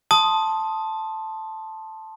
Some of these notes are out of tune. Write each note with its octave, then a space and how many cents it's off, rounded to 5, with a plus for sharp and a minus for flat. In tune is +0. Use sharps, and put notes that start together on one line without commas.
A5 +0 C6 +10 D#6 +0